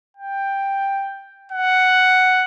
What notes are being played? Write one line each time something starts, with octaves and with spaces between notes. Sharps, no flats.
G5
F#5